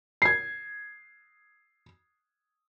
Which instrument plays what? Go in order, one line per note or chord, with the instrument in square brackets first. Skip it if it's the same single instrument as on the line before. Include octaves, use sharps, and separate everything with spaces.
[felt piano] G#6 C7